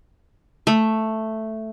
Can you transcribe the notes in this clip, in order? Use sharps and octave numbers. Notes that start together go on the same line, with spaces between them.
A3